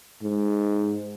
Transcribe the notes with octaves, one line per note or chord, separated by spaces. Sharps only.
G#2